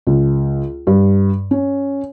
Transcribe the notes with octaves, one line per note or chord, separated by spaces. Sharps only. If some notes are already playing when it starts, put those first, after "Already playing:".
C#2
G2
C#4